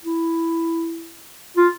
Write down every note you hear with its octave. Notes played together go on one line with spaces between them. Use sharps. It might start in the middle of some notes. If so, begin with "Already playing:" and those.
E4
F4